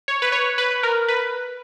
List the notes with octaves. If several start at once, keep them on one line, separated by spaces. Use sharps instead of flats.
C#5
B4
C#5
B4
A#4
B4